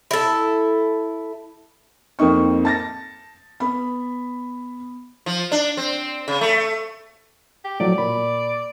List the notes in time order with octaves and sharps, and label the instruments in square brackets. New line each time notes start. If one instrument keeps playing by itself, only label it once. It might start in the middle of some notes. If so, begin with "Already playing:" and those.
[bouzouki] E4 A4
[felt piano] F2 A#3 C4 D#4 C#6
A5 A6 A#6
B3 B5
[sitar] F3
D4
C4
C#3
A3
[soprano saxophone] G4
[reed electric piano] A2 F3 F#3 [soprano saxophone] D5
[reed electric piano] A#2 B5